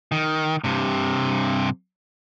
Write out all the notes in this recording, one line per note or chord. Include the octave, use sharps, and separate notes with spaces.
D#3
G2 C3